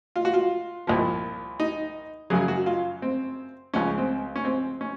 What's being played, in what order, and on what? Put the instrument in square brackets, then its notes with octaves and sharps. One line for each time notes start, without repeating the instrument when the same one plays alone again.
[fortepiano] F4
F#4
F4
C2 A#2 F3
D#4
F#2 C#3 F#3 G#4
F#4
F4
C4
C#2 C#3 F3 C#4
C4
C#4
C4
C#4